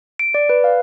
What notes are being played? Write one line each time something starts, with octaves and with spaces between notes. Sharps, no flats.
D7
D5
B4
F5